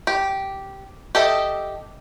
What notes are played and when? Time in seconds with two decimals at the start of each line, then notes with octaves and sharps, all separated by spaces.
0.07 G4
1.15 G4 A4 D#5 E5